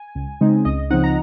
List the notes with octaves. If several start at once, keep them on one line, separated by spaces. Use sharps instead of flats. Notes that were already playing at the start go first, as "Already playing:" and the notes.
Already playing: G#5
C#2
C#3 G#3 C4 D#4
C#2 D#5
C#3 F3 C4 D#4 F#5
A#5